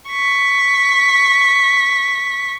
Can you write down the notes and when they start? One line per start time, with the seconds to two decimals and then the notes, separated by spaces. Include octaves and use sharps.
0.10 C#6 B6